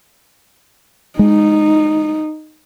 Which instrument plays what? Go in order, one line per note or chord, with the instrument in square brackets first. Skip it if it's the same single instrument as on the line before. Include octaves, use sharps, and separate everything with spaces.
[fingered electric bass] G#3 [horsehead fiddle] D#4